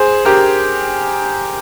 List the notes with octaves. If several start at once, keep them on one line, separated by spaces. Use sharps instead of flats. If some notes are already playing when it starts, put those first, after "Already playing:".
Already playing: G#4 C5
G4 A#4